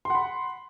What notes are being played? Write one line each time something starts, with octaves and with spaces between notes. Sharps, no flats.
F#5 B5 C6